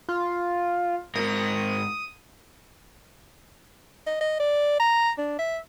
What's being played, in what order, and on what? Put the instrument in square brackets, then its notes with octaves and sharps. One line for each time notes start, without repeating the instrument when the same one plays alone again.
[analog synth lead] F4
[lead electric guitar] G#2 A#4 [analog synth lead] D#6
[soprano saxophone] D#5
D#5
D5
A#5
D4
E5